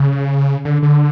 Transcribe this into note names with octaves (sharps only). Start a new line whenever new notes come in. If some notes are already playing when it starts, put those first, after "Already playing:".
Already playing: C#3
D3
D3